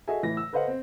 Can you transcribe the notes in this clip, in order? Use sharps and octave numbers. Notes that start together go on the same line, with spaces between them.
F#4 G#4 A4 D#5 E5 G#5
A2 E3 A#6
E6
A4 B4 C5 D#5 F5 F#5
C4